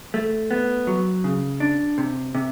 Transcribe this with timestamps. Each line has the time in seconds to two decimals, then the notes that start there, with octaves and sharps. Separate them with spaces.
0.14 A3
0.51 B3
0.87 F#3
1.24 C#3
1.60 D4
1.98 C3
2.35 C3